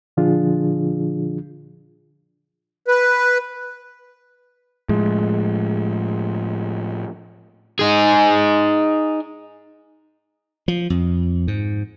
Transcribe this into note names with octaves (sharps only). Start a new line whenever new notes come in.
A#2 D3 F3 D4 F4 G#4
B4
A2 F3 G#3
D#4 G#4
F3
F2
G#2